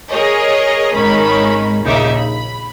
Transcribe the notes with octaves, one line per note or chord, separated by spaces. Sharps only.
G#4 A#4 C#5 D#5
G#1 D#3 G#3 C#4 B5
A#1 D#2 C#3 D#4 E5 D6
B5